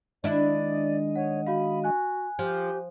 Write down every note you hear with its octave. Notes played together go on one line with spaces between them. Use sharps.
D#3 G#3 D4 E4 D5 D#5
C#5 F#5
F#4 F5 B5
F#4 G#5 F#6
F3 G4